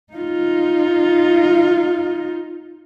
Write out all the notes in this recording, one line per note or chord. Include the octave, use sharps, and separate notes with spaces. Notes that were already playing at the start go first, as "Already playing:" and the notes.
D#4 F4